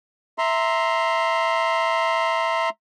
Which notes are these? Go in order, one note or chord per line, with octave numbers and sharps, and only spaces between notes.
E5 A#5 C6